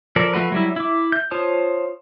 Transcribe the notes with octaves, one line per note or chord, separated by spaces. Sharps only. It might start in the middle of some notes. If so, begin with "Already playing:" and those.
F3 A4 A#4 D5
F3 A3 F#4 B4
F#3 G3 E4
E4 D6
G6
F4 C5 C#5 A5 D#6